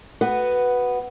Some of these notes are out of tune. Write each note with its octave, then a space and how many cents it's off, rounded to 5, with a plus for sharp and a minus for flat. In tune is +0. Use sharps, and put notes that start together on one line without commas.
B3 +0 F#4 +0 B4 +0